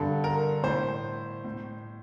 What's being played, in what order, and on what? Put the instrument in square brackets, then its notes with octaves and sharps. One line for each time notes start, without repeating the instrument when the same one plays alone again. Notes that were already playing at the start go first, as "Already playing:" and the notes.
Already playing: [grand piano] G2 D3 A4
A#4
A2 C5
A2